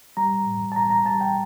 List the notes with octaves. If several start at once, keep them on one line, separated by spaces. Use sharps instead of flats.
G3 A#5
A2
A5
G3 A#5
A#5
G3 A5
G5